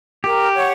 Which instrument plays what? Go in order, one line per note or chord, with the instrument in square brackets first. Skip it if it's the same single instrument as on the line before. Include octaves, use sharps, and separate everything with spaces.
[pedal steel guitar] G4 [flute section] A#4
[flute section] C#5 F#5 C#6